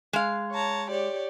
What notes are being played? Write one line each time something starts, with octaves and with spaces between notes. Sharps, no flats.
G#3 F5
C#5 A5 A#5
G4 C#5 D5